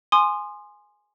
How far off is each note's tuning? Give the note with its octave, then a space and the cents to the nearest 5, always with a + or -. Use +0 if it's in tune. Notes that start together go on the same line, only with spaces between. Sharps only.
G#5 +0 C6 +0 D#6 -35